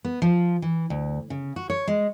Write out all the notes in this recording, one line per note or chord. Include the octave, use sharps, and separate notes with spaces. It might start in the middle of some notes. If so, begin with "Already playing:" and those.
B3
F3
E3
D2
C#3
F#4
C#5
G#3